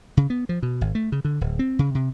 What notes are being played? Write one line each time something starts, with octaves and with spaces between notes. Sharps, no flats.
C#3
B3
F3
B2
G#1
A3
C#3
D3
D1
C4
C#3
C3